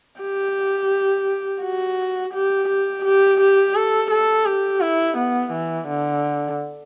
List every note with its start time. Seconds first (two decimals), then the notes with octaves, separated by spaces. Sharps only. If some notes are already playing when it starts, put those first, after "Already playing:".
0.21 G4
1.62 F#4
2.34 G4
2.69 G4
3.05 G4
3.41 G4
3.75 A4
4.11 A4
4.46 G4
4.81 E4
5.17 B3
5.53 E3
5.88 D3